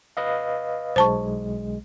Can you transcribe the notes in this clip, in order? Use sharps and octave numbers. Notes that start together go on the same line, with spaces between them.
B4 D#5 F5
B1 G#3 C5 A5 C#6